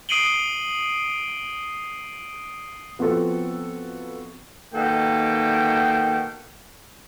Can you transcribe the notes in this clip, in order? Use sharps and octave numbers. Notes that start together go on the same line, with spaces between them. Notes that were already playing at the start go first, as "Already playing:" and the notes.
D#6 C7 D7 D#7 F#7 G7
F3 B3 C4 F#4 A4
B2 D#3 A#3 A4 G5